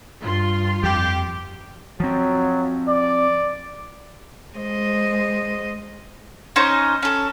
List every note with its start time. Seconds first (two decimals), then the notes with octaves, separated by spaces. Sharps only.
0.23 G2 F4 C6
0.83 F2 G4
2.00 F3 F#3 C4
2.89 D5
4.57 G#3 C5 D#5
6.56 C#4 D#4 C5
7.02 C#4 A4